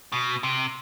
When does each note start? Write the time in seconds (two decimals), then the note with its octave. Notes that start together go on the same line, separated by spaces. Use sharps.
0.12 B2
0.43 C3